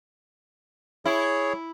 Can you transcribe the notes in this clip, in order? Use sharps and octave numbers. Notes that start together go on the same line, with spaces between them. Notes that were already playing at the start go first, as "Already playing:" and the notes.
E4 G#4 C#5